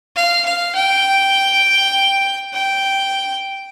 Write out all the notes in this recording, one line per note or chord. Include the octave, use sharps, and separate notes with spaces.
F5
F5
G5
G5